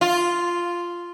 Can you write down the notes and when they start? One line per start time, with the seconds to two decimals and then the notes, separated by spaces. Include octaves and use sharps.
0.01 F4